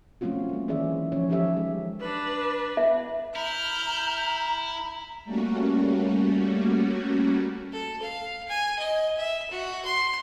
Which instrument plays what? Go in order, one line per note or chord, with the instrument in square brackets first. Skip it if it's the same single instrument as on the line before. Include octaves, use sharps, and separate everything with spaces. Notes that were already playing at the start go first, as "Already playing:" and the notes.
[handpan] F#3 A3 C4 C#4 F4 F#4
G#3 A#3
D#3 E3 C#4 G#4 D5 E5
F3 F#3 C#4 C#5
F3 D#4 G4 A4 C#5 E5
G#3
[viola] D4 B4
[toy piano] E5
[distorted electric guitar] E4 [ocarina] A#5 [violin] F6 G6
[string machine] G3 A3 A#3 C#4 F#4
[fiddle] A4
F5
G#5
D#5
E5
F#4
C6